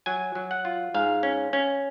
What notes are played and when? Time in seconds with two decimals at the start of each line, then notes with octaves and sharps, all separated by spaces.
0.06 F#3 G#5
0.35 F#3
0.51 F#5
0.65 F4
0.94 G#2 F5
1.23 C#4
1.53 C#4